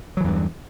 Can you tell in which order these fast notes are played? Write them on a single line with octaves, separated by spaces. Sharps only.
F#3 E3 E2 G2